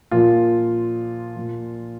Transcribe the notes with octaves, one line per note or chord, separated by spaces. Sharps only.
A#2 F3 F4
A#2 F3